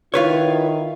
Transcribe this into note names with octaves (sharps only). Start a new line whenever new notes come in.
D#3 E4 F4 B4 C#5